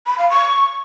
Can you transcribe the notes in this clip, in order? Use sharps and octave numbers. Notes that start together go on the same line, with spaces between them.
B5
F5
C#6